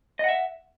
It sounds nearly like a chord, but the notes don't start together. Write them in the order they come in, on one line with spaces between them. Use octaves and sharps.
D#5 F#5 E5